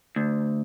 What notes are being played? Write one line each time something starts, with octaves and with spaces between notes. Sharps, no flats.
D2